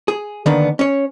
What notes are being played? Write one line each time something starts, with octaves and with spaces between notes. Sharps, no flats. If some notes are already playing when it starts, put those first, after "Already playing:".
G#4
D3 D#3 A#3 B3 D4
C#4 C#5